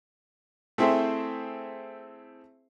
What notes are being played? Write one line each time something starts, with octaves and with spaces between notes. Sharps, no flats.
A3 C4 E4 G#4 C5 E5